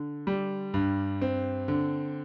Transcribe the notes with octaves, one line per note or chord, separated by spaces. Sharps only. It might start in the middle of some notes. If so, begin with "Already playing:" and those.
Already playing: D3
G3
G2
C4
D3